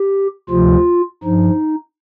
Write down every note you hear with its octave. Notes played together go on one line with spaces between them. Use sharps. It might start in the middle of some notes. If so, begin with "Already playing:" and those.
Already playing: G4
D2 C3 F3 F4
G2 F3 D#4